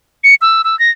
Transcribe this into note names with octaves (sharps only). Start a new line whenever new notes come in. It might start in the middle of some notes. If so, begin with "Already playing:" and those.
C#7
E6
E6
A#6